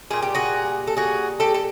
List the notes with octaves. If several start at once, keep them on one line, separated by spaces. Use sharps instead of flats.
A#2 G3 G#4
G4
F#4 G#4
A4
F#4 G#4
G4 A4
A4